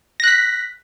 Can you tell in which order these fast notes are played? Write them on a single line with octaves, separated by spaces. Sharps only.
A#6 F#6 B6